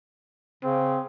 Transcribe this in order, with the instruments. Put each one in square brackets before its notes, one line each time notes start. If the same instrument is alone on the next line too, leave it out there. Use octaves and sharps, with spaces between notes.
[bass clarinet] C#3 [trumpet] C4